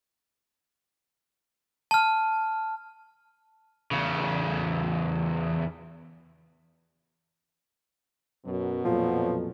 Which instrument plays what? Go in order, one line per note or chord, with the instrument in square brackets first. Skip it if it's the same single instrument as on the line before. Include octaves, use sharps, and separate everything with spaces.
[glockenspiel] A5 F6
[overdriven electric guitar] E2 C#3
[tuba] F#2 [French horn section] B2 F#3
[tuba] F2 [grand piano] A#2 [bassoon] F3